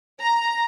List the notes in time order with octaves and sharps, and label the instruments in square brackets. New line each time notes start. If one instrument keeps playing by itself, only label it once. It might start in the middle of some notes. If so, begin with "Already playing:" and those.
[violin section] A#5